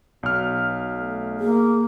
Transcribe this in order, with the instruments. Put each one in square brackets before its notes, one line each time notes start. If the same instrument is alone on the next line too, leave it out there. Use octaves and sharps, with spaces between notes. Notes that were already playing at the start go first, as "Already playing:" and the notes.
[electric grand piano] B1 F6 [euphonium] B2
[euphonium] A3
[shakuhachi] A#3 [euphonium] G#4